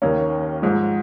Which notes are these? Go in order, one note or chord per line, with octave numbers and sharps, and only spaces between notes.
D#2 D#3 A#3 C#4
G#2 F3 G#3